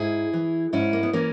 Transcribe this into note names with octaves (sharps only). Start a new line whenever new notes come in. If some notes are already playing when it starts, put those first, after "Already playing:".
Already playing: G#2 E4 G#4
E3
G#2 C#4 E4
A#3
B3
E3 A#3 C#4